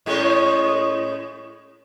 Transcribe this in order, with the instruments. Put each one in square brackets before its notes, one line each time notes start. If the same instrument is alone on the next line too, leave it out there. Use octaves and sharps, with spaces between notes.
[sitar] A2 G#3 C#4